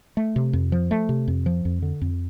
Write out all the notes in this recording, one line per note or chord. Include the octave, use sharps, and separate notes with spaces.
A3
C3
F2
F3
A3
C3
F2
F3
F2
D3
F2